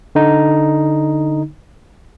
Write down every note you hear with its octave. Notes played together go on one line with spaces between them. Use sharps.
D3 D#4